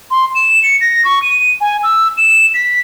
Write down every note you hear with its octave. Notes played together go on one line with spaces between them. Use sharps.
C6
E7
C#7
A#6
C#6
D#7
G#5
E6
E7
B6